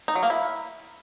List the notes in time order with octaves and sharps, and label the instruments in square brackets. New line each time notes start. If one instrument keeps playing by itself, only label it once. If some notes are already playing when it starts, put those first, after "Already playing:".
[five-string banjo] D#4
F#3
A#3
E4